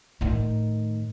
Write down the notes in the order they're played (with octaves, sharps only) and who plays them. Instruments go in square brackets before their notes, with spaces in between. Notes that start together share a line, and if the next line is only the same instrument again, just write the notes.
[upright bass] A2 D#3